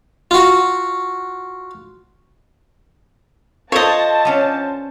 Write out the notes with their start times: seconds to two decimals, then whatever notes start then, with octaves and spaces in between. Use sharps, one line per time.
0.31 F4 F#4
3.72 F4 A4 C5 C#5 D#5 A5
4.25 B3 C#4 D4